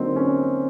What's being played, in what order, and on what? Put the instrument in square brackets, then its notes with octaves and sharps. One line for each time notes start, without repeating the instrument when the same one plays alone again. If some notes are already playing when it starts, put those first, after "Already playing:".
Already playing: [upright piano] D3 F#3 A#3 D#4 F#4 [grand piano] C4
[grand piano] C#4